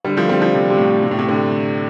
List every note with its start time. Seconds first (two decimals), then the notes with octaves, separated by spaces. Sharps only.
0.05 D3 G3
0.17 F3 A3
0.29 G3 C4
0.41 F3 A3
0.54 C3
0.70 C3
0.78 A2
1.03 C3
1.11 A2
1.19 C3
1.28 A2 D3